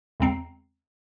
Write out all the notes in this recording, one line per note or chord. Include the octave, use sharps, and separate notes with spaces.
E2 C#3 G#3 C4 A#5 C7